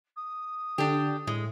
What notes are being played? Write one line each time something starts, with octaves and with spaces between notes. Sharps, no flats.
D#6
D3 D4 G4
A2 G#3